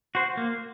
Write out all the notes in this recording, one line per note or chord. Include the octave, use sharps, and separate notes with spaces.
F#4 C5
A#3